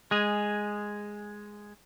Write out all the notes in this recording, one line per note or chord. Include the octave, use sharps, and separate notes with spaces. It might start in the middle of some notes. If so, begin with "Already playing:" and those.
G#3 G#4